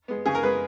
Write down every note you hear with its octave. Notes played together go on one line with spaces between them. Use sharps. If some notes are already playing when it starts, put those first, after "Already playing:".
G#3 B3
C#3 G#4
A#4
G#3 B3 B4